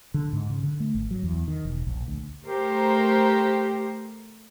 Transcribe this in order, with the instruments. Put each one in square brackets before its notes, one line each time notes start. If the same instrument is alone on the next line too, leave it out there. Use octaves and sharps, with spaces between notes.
[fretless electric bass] D3
G#2
C#3
D3
A3
G#1
F#3
E2
D#3
E1
A#1
D2
[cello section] A3 A#4 C5 [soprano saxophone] G4